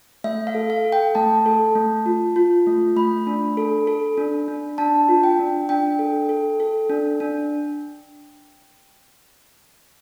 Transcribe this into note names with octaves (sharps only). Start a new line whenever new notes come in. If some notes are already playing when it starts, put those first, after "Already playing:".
A3 E5
F5
A4
F5
A4
G5
A3 A5
A4
A3
F4
F4
A3
A3 B5
D4
A4
A4
D4
D4
D4 A5
F4
G5
D4
D4 G5
A4
A4
A4
D4
D4